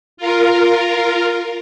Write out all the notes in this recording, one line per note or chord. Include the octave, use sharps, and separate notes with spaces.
F4 A#4